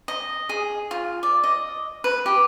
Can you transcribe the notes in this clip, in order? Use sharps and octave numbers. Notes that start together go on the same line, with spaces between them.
D#5
G#4
F4
D5
D#5
B4
G4